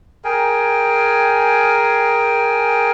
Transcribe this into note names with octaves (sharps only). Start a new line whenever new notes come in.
G#4 A#4 G5 G#5